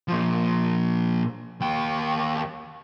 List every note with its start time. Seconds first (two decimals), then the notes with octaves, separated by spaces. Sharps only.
0.08 A#2 F3
1.61 D#2 G5